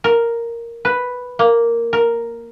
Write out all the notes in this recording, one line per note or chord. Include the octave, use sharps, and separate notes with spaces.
A#4
B4
A#3
A#4